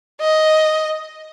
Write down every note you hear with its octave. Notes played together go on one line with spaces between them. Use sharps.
D#5